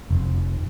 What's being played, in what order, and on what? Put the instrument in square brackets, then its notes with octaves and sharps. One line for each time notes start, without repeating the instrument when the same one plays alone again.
[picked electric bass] F1